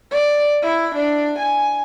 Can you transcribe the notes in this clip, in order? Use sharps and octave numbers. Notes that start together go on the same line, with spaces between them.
D5
E4
D4
G#5